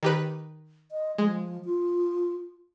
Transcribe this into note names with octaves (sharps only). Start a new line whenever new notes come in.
D#3 G4 B4
D#5
F3 G#3
F4